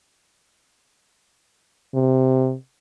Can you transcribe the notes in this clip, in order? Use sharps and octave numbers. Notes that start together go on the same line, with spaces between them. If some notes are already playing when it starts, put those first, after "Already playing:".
C3